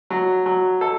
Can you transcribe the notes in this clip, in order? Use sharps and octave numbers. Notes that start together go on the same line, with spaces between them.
F#3
F#3
A4